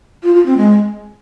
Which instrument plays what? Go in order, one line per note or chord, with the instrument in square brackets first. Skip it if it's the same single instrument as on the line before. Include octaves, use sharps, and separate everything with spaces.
[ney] F4
F4
C4
G#3